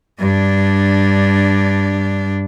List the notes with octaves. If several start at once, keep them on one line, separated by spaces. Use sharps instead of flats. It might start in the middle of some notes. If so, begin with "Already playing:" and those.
G2 D4